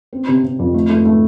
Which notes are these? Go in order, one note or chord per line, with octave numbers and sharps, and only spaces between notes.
C4
C3
C3
F2
A3
A3
A3